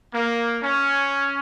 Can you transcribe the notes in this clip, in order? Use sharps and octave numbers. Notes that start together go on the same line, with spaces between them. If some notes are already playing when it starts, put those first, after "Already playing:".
A#3
C#4